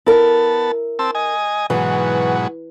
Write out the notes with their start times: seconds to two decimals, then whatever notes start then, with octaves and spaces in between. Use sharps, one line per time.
0.06 B3 E4 A#4 A5
0.99 C4 A5 E6
1.15 D#5 G#5
1.70 G#2 B2 E3 F#3